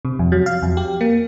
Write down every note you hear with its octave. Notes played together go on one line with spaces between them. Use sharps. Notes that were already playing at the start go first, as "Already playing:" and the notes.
C3
F2
F#3
F5
F2
G4
A#3